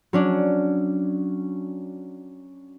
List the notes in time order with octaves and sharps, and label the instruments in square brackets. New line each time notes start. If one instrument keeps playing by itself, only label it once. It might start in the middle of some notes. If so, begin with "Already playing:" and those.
[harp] F#3 C#4 D4